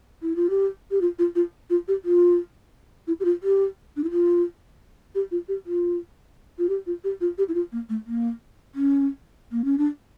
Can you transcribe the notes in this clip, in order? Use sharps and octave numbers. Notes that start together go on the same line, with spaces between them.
E4
F4
G4
G4
F4
F4
F4
F4
G4
F4
E4
G4
F4
G4
D4
E4
F4
G4
F4
G4
F4
F4
G4
F4
G4
F4
G4
E4
F4
A#3
A3
A#3
C#4
A#3
C#4
D4